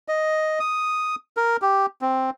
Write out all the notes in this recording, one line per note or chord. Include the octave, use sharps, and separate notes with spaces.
D#5
D#6
A#4
G4
C4